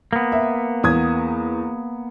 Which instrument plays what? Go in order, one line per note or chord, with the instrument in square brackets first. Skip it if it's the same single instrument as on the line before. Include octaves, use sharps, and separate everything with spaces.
[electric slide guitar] A#3 B3
[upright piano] E5
E2 D#6 G#6